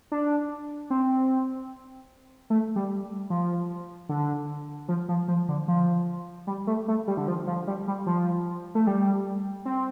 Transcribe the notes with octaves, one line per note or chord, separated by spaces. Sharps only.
D4
C4
A3
G3
F3
D3
F3
F3
F3
D3
F3
G3
A3
A3
G3
D3
F3
F3
G3
G3
F3
A3
G3
C4